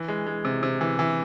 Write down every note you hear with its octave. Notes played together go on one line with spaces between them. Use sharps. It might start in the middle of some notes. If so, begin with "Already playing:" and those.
Already playing: E3
G#3
G#3
C3
C3
E3
E3